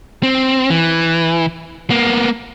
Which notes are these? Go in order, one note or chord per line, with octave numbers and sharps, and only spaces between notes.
C4
E3
A#3 B3